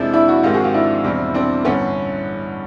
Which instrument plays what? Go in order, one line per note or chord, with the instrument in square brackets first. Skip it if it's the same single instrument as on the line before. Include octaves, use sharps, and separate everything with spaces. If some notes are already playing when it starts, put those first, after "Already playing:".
Already playing: [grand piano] F2 C3 F3 G#3 [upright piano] D4 E4
[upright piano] D4 E4
E4 F#4
[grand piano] G#2 D#3 G#3 C4 [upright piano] F4 G4
[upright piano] F#4 G#4
F4 G4
D4 E4
[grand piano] E2 B2 G3 C4 F4
[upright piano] C4 D4
[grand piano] A1 G2 D3 [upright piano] B3 C#4